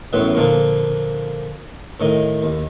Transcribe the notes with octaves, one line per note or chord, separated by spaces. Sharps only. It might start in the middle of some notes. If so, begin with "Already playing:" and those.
A1 F#2 A2 B3 B4 C6
A#2 D3 F3 A#3
A2 D#3 D#5
D#2